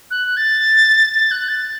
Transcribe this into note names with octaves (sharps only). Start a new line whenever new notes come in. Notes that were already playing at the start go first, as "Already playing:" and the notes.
F#6
A6
A6
F#6
A6